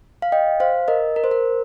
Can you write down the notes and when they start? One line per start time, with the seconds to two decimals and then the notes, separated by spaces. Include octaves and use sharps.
0.22 F5
0.32 D#5 G5
0.60 C5 F5
0.88 A#4 D#5
1.16 A#4
1.24 C5
1.31 A#4